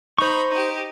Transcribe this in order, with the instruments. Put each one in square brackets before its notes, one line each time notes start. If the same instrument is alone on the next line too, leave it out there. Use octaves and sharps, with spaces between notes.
[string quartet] D#4 A#5 B5 [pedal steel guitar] C5 C#6
[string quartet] D#4 G4